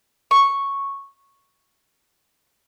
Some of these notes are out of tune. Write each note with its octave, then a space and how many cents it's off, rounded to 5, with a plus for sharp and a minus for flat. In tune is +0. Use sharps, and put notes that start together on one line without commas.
C#6 -5